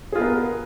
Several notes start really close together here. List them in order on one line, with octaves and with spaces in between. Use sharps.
G#4 F4 B3 A#4